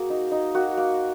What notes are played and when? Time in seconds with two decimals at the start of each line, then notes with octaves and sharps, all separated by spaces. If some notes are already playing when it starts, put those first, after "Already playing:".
Already playing: A#3 F#4 G#4
0.10 D#4
0.31 D#4
0.54 A#3 F#4
0.77 A#3